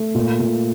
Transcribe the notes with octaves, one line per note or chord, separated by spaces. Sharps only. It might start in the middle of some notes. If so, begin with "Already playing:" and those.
Already playing: A3
A#2
A#2